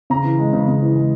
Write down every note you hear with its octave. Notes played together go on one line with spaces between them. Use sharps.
C#3 A#5
E3
G#3
C#3
C#3
E3
G#3